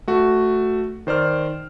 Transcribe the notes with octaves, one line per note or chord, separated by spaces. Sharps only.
A3 F#4
D#3 C5 D5 F6